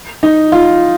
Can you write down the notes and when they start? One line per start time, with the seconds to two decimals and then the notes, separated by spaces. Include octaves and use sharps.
0.23 D#4
0.52 F4